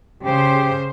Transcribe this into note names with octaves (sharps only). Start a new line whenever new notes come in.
C#3 G4 C5